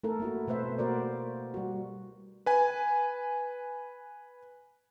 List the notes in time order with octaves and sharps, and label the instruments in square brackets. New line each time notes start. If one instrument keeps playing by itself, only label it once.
[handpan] A3 E4 A4 A#4
A#3 E4 F#4
B2 A3 B4 C5 E5
A#3 F#4 A#4 C5 D5
G3 F#4
[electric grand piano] B4 G#5